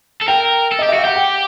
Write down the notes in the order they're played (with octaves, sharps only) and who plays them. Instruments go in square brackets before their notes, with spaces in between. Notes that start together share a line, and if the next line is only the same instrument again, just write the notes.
[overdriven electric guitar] A4
[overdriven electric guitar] A#4 [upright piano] G5
[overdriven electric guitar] A4
[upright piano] D#5
[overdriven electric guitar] G4
[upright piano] E5
[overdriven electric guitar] F#4 [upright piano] F5
[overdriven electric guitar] G4 [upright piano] F#5
[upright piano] G5